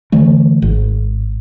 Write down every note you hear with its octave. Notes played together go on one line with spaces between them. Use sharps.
D3 E3 A3
G#1